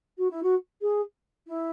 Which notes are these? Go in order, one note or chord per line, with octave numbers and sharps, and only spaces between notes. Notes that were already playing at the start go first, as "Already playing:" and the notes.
F#4
E4
F#4
G#4
E4